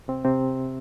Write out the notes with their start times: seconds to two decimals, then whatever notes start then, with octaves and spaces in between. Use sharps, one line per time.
0.08 C3 C4
0.24 C3 C4